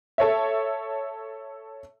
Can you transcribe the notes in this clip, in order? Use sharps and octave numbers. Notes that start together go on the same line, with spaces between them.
A4 C#5 E5